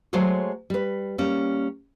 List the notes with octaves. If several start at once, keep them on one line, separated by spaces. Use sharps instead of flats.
F#3 G#3 A3 C5 C#5
G3 B4
G3 A#3 C#4